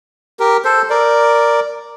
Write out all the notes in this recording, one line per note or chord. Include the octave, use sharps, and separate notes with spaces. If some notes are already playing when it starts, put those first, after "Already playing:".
G4 A#4
A4 C5
A#4 D5